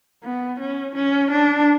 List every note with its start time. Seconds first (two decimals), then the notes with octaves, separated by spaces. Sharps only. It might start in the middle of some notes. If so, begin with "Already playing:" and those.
0.23 B3
0.60 C#4
0.95 C#4
1.31 D4